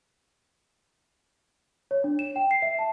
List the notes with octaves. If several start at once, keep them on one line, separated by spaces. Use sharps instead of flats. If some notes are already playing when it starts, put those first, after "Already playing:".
C#5
D4
E7
G5
C7
E5
A5